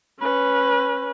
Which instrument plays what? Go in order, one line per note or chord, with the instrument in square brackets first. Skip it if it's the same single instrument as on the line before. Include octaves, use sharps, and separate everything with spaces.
[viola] C#4 B4